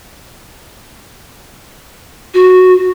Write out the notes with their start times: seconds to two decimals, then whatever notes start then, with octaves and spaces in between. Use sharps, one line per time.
2.34 F#4